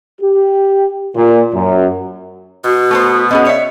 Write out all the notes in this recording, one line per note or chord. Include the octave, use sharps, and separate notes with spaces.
G4
A#2
F#2
B2 F#4
A3 B3 C5
B3 C#4 G#4 D#5 F#5
C#5 D5 E5